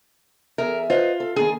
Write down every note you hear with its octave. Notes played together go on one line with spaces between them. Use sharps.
E2 G#4 A#4 E5
F4 B4 C5 D#5
A4
D3 D#3 A#3 G#4